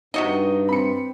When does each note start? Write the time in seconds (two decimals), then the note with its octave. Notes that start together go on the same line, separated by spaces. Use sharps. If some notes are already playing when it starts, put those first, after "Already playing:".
0.14 G2 C3 D#4 F#4 D#5
0.69 C4 B5 C#7